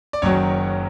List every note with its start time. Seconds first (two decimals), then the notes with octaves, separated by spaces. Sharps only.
0.13 D5
0.22 F#1 F#2 D#3 F#3 C#4 C#5